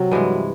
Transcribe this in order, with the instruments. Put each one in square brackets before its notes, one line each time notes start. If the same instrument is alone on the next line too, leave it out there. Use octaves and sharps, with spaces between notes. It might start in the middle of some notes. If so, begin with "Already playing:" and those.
Already playing: [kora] C3 [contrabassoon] F#3
[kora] G2 E3 G#3